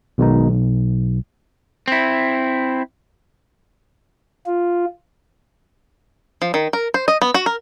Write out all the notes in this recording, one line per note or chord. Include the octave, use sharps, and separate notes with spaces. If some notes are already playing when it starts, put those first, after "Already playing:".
B1 B2 D#3 G#3 B3 D#4
B1
C4 E4
F4
F3
D#3
A#4
C5
D#5
B3
F#4
A#4